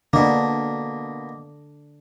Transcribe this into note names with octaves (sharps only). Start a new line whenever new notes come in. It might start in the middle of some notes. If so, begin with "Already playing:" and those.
B2 D3 A#3 D4